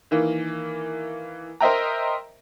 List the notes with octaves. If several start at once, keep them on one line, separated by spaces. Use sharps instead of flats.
D#3 E3 A#3
A#4 C5 D#5 E5 G5 A#5